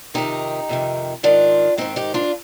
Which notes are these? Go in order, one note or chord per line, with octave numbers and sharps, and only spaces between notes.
F2 C3 D#3 D#4 G4
F2 C3 D#3
G#2 D#3 D4 F4
G#2 D#3 C4 D#4
D#4 G4
D4 F4